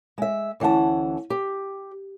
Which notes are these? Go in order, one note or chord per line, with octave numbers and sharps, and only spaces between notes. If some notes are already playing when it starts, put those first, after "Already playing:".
G#3 E5
D2 E3 C#4 F#5 A5
G4